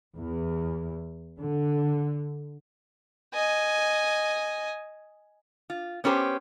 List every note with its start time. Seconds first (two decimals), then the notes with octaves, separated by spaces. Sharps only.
0.18 E2
1.39 D3
3.33 D#5 G#5
5.70 F4
6.04 B3 C#4 G4 A#4 C5